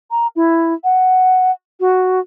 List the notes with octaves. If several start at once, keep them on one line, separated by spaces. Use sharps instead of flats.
A#5
E4
F#5
F#4